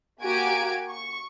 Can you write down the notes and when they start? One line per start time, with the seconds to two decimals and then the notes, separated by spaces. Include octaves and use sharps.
0.23 A#3 F#4 G4 G#5 G#6 D7
0.89 C#6